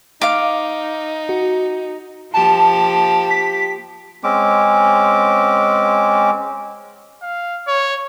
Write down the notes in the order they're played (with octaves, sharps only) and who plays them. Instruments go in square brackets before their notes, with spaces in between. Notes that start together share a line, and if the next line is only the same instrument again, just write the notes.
[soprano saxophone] D#4 [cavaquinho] F5 D6
[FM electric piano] F#4
[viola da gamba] F3 A#3 G4 [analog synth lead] A5
[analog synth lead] B6
[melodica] G#3 C4 C#4 D6
[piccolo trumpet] F5
C#5